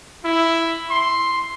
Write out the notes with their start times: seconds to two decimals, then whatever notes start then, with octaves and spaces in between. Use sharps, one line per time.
0.24 E4
0.90 C6